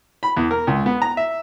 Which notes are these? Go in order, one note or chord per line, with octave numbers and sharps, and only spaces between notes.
B5
E2
A#4
C#2
B3
A#5
E5